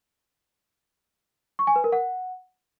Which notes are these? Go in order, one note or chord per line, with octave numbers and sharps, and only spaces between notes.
C#6
G#5
B4
A#4
F#5